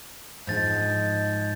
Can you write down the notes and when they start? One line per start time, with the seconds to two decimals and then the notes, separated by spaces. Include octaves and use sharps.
0.47 G#2 F3 D#4 G6 A6